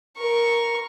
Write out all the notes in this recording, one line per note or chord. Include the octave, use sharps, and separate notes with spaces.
A#4 C#6